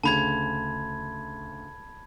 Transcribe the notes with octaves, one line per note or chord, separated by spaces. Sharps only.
D2 C#3 A5 B5 G#6